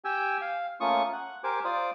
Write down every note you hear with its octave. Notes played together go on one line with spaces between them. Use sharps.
G4 G5 G#5 E6
F5
A3 A#3 C#4 F4 C#6 D#6
F#5
G4 A#4 C5 G#5 D6
F4 C5 D5 D6 D#6